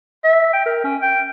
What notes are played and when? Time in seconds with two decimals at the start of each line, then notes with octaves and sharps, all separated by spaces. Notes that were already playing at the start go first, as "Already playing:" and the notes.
0.24 E5
0.53 G5
0.66 A#4
0.84 C#4
1.02 G5